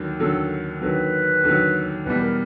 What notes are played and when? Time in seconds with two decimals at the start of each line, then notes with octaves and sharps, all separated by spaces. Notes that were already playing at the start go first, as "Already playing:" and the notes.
Already playing: D#2 D3 F#3
0.20 D#2 D3 F#3 A4
0.82 D#2 D3 F#3 B4
1.44 D#2 D3 F#3
2.05 E2 B2 G3 B4
2.21 A#4